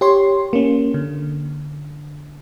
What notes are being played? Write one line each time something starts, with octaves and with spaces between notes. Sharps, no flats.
G4 C#5 C6
A#3 C#4
D3